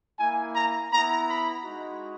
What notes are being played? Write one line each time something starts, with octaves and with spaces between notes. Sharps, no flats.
A#3 E4 G#5
A#5
B3 E4 A#5
B5
G#3 D#4 F#4